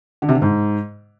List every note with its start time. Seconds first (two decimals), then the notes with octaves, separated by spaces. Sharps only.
0.22 D3
0.29 C3
0.35 D3
0.42 G#2